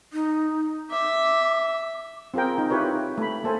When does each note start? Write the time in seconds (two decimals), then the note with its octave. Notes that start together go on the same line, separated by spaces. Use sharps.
0.13 D#4
0.91 E5 D6
2.34 C4 F4 G#4 A#4 G5
2.58 D#4
2.70 E4 F4 G4 B4 C#5
3.18 A3 B5
3.44 A#3 A4 C5 G#5